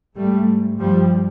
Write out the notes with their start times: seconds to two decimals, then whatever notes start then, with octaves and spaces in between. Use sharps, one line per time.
0.16 G#2 G3 A3
0.79 G2 F3 G3